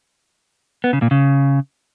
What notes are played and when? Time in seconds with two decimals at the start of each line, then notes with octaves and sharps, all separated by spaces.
0.84 B3
0.93 C#3
1.02 A#2
1.11 C#3